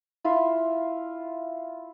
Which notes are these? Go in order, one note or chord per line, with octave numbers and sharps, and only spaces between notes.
E4 F4 E5 C6